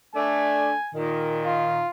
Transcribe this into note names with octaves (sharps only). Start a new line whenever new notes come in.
A3 D4 G#5
A#2 D#3
F4